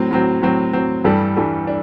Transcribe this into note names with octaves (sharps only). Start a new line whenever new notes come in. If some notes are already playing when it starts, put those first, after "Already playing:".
Already playing: A2 F#3 C4
A2 F#3 C4
A2 F#3 C4
A2 F#3 C4
G2 E3 G3 D4 A4
G2 E3 G3 D4 A4
D4